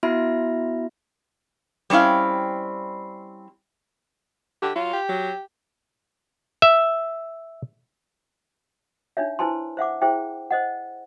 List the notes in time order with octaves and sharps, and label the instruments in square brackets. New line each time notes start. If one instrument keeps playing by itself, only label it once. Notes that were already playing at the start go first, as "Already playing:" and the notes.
[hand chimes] B3 E4 F#4 E5 B5
[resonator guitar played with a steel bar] G3 C4 C#4 E4 F5
[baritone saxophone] D3 [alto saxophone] G4
[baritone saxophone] F#3 [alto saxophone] F4
[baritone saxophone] G4
[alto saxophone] F#3
[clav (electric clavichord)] E5
[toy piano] D4 D#4 C#5 E5
E4 B4 C5 G#5 A5 C6
C5 E5 F#5 D6
E4 G#4 C5 E5 G5
C5 D#5 F#5